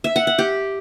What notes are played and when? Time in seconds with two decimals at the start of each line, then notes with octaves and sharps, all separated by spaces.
0.04 E5
0.16 F#5
0.27 F#5
0.38 G4